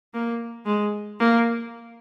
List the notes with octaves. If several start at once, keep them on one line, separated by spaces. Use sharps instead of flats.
A#3
G#3
A#3